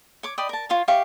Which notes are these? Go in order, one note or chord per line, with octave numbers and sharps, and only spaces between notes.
C#5 D6
D5 D#5 G5 B5
A#4 A5
F4 C#5 F5
G4 E5 F5 C#6